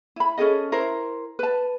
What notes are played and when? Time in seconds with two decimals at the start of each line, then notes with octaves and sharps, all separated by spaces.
0.16 E4 B5
0.38 C#4 G#4 A4 D#5
0.72 E4 A#4 C5
1.39 B4 A5